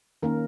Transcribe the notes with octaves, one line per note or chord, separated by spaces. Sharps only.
D#3 A#3 C#4 A#4